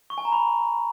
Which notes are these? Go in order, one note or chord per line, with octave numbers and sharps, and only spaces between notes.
C#6
G#5
A#5
B5